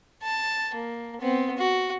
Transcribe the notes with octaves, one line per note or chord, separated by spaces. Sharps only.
A5
A#3
B3 C4
F#4